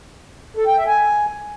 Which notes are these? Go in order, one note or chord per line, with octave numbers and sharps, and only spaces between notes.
A4
G5
E5
G#5